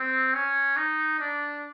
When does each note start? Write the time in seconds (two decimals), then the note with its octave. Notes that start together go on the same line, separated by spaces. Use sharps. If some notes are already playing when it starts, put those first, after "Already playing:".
Already playing: C4
0.34 C#4
0.77 D#4
1.20 D4